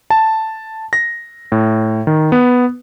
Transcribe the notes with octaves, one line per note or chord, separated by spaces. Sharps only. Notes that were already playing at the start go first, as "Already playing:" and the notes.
A5
A#6
A2
D#3
B3